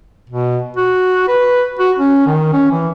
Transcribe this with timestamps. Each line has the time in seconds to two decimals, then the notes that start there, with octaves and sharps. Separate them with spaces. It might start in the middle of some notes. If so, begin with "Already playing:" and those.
0.30 B2
0.77 F#4
1.28 B4
1.79 F#4
1.99 C#4
2.26 D#3
2.53 C#4
2.71 E3